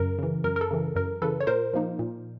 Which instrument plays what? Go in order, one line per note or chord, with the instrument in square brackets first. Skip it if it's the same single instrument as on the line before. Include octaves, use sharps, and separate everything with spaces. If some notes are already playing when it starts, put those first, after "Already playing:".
Already playing: [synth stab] F#2 C#3 A#4
C#3 E3
F#2 A#4
A#4
A4
C#3 E3
F#2 A#4
C#3 E3 A4 B4
C#5
A#2 A#4 C5
F3 A#3 D#4
A#2